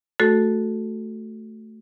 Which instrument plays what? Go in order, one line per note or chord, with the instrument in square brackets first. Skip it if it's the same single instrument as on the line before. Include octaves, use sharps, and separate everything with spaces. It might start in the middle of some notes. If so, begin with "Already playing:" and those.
[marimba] A3 F#4 A4